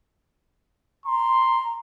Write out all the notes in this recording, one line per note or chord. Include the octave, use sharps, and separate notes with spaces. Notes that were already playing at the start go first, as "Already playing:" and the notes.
A#5 C6